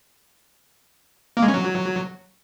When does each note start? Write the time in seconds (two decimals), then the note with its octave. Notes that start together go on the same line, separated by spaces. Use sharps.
1.37 A#3
1.43 G#3
1.48 C#4
1.54 F#3